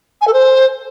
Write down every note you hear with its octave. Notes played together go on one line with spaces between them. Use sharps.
G#5
A4
C5